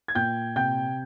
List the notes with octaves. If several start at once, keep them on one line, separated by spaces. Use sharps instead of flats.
G#6
A#2 G5 G6
C3 G5 G6